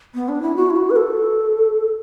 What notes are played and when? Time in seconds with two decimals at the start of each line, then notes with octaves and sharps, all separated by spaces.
0.15 B3
0.29 D4
0.42 E4
0.56 F#4
0.70 E4
0.76 F#4
0.90 B4
0.96 A4